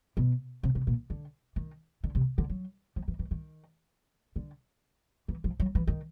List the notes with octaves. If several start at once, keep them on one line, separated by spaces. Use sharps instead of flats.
B2
C3
C3
A#2
D3
D#3
D3
C3
D3
F#3
F3
E3
E3
D#3
D3
E3
F3
F#3
E3
D#3